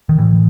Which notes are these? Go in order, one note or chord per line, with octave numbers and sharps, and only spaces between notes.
D#3
A2 E3